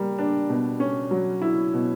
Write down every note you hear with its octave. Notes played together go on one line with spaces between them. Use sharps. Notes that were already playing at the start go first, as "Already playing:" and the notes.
Already playing: G3 A#3 A#4
D4
B2
C#4
F#3
E4
B2